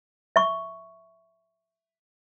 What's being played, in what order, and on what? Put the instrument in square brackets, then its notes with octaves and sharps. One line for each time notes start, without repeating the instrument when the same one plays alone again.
[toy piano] E5 C#6